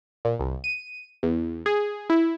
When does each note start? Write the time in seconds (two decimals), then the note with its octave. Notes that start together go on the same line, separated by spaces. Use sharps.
0.25 A#2
0.40 C2
0.64 D#7
1.23 E2
1.66 G#4
2.10 E4